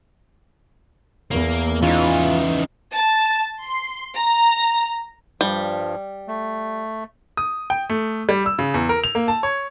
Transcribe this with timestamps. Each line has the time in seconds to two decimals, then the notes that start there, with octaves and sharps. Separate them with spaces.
1.31 E2 A#3
1.82 C#3 E3 D#4 F4
2.94 A5
3.63 C6
4.16 A#5
5.41 G2 F3 G3
6.28 A3
7.37 D#6
7.70 G5
7.90 A3
8.29 G3
8.46 E6
8.59 C#3
8.74 E2
8.89 A#4
9.04 F7
9.15 A#3
9.28 A5
9.43 C#5